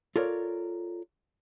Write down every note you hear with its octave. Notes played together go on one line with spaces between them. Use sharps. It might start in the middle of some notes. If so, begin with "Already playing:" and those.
F4 A4 A#4 C#5 D5